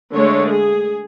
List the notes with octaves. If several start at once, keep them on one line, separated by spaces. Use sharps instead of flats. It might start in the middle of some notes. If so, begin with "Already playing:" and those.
D3 G#3 A3 C#5
G#4